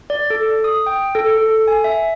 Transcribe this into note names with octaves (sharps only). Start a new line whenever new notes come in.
D5
A4
D#6
G5
A4
A4
G#5
E5